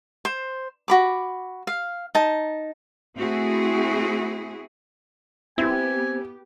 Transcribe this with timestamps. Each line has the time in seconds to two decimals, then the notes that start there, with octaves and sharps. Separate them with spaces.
0.25 C5
0.88 F#4 B5 D6
1.67 F5
2.15 D#4 A5
3.17 A3 C4 E4 F#4 G#4
5.58 B3 C4 E4 G4 G#5